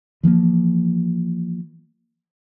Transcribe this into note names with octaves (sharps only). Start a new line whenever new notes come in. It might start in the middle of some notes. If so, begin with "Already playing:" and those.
E3 F3 G#3 A#3